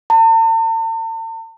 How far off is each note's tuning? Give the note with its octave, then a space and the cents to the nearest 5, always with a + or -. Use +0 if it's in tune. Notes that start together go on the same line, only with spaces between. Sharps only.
A5 +45